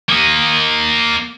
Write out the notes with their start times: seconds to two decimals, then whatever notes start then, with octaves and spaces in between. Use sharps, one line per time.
0.09 A#3 D#5